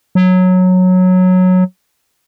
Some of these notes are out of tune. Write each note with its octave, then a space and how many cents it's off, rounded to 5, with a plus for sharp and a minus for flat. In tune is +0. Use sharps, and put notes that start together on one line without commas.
F#3 -10